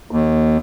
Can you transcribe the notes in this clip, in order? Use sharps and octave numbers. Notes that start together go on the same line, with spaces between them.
D#2